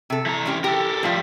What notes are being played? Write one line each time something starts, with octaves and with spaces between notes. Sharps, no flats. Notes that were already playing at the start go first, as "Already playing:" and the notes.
C3 A4
E3 A#5
G#3 C#4 G4
G4 A4 A#4
A2 F3 G3 F4